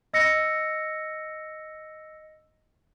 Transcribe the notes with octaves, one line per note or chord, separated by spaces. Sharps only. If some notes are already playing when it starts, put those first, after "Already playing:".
D#5 E6 A#6 C#7